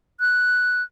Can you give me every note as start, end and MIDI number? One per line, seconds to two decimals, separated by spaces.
0.20 0.82 90